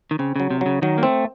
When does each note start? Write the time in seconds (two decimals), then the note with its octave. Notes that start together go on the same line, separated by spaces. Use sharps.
0.11 D#3
0.19 C#3 C4
0.36 C#3 F#3
0.50 C3
0.61 C#3 F#3
0.82 D#3 F#3
0.98 A#3
1.03 A3 C4